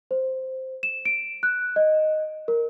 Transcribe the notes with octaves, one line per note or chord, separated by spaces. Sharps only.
C5
E7
D7
F#6
D#5
A#4